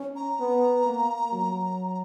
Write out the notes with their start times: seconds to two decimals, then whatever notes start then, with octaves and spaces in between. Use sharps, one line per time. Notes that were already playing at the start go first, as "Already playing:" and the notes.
Already playing: C#4
0.16 A#5
0.40 B3
0.86 A#3
1.32 F#3